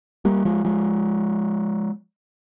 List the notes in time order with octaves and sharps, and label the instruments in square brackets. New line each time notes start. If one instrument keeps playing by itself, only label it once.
[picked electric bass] G3 A#3
F3 G#3
F3 G#3